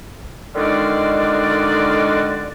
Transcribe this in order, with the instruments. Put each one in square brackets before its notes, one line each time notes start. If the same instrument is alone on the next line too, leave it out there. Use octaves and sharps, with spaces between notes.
[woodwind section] D3 D#3 G#3 F4 F#4 D5